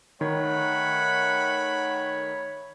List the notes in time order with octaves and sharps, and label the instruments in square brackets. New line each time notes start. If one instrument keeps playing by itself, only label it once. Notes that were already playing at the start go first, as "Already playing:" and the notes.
[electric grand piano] D#3 [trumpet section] A3 B5 [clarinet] C#5 [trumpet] F#5